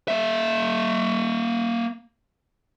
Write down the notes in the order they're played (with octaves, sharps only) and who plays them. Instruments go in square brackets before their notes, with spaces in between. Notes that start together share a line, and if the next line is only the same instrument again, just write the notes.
[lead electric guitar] A#3 E5